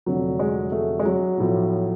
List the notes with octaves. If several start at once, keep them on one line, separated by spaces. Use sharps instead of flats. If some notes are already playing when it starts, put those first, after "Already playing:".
F1 F2 D3 F#3
G#3
A3
G#3
F#3
B1 A2 F3